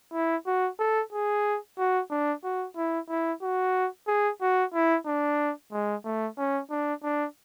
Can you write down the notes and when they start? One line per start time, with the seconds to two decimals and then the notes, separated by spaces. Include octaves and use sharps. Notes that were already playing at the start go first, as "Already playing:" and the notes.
0.13 E4
0.46 F#4
0.79 A4
1.12 G#4
1.78 F#4
2.10 D4
2.43 F#4
2.76 E4
3.09 E4
3.42 F#4
4.07 G#4
4.41 F#4
4.74 E4
5.06 D4
5.72 G#3
6.05 A3
6.38 C#4
6.71 D4
7.03 D4